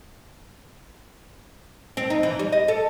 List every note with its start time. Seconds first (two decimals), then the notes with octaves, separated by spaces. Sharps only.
1.97 C4
2.10 D#4
2.23 E3
2.39 G3
2.52 D#5
2.68 A4